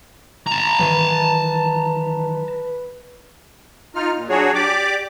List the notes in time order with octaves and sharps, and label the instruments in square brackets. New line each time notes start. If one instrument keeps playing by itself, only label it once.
[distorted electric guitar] A5 A#5
[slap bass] D#3 E3 F#3 [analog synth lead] B4
[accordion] D#4 F4 F6
A#2
F#3 D4 F#4 G#4 C#5
G4 D5 D6